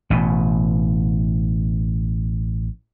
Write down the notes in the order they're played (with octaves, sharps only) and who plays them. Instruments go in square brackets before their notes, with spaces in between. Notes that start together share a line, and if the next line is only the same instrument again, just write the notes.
[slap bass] A1 B2